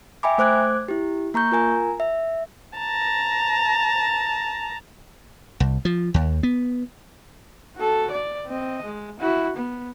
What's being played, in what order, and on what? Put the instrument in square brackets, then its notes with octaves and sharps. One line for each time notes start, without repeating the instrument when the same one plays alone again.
[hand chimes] E5 G5 G#5 B5 D6
A3 C5 D6 F#6 G#6
E4 G4
A#3 A#5 C#6 G6
F4 A#4 G#5 A#5
E5
[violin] A5 A#5
[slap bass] C2
F3
D#2
B3
[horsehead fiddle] F#4 A4
D5
C4 D#5
G#3
E4 F#4
B3